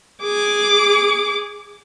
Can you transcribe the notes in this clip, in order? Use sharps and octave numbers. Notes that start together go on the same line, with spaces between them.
G#4 D6